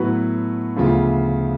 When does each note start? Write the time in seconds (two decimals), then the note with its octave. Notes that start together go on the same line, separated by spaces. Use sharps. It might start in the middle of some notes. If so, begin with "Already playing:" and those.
Already playing: A2 F#3 B3 F#4 B4
0.77 D2 C#3 F3 B3 F4